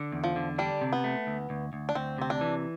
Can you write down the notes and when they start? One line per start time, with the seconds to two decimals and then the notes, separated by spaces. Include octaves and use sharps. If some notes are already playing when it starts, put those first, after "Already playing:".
Already playing: D3
0.12 E2
0.24 F3
0.36 D3
0.58 G3 D4
0.81 C3
0.92 B3
1.04 A3
1.27 D2
1.50 D2
1.73 D2
1.89 D4
1.95 D2 C4
2.18 C3 C4
2.30 D4
2.41 E3